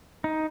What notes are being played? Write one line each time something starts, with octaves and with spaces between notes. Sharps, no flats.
D#4